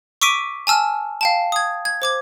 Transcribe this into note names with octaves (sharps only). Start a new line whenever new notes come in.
C#6 D6 E6 B6 D7 D#7
G#5 A5 E6 F6
F5 G5 A5
D#6 G#6
G#6
C5 D6 G#6